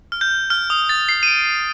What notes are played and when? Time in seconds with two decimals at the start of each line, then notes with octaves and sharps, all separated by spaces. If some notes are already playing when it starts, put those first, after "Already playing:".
0.12 F6
0.21 G6
0.50 F6
0.70 D#6
0.89 A6
1.09 C7
1.23 D#7
1.27 D7